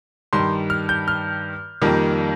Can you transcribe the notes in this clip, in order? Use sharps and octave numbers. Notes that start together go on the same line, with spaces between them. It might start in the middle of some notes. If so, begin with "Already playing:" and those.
G2 D#3 G3 C6
F6
G6
F6
F2 D#3 G3 A#3